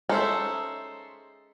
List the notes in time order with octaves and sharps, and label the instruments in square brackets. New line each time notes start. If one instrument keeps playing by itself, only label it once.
[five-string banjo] G#3 C#4 D#4 [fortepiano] A4 C5 E5